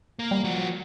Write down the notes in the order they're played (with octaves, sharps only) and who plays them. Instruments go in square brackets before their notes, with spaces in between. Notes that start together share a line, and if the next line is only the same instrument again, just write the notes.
[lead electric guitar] A#3
[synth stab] G3
[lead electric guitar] F3 F#4